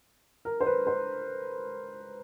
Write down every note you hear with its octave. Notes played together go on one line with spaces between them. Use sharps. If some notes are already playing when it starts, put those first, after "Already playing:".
A#4
C5
B4
C5